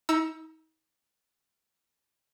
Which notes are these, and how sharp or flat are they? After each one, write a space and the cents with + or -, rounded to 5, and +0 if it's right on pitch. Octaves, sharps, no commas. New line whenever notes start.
D#4 +40 A#5 +0 E6 +0